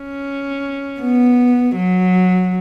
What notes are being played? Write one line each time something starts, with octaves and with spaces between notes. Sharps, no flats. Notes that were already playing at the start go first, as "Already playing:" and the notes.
Already playing: C#4
B3
F#3